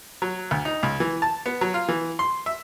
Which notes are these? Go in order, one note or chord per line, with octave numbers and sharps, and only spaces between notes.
F#3
D2
D#4
C#2
E3
A5
B3
F#3
F4
E3
C6
E5